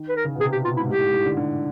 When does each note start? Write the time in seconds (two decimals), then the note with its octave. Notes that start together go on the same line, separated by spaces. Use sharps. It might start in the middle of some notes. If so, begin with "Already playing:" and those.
Already playing: D#3
0.09 B4
0.17 A#4
0.24 C#3
0.35 B2
0.40 C3 G#4
0.52 G4
0.64 B2 F4
0.77 E4
0.79 G#2
0.88 A2 G4
1.01 G#2
1.13 A2
1.25 D3
1.37 D3